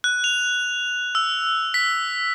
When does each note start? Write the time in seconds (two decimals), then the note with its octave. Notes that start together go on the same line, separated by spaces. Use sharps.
0.04 F#6
0.24 F7
1.15 E6
1.74 B6